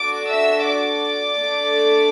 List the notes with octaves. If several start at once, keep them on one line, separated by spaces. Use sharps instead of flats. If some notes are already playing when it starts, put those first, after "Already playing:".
Already playing: D4 F#4 A4 D5 D6
E5 E6
D5 D6
A3 D4 A4